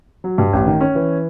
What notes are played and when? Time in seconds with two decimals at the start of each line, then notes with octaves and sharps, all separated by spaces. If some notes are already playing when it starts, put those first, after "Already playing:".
0.24 F#3
0.38 G2
0.53 A1
0.67 D#3
0.80 C#4
0.95 E3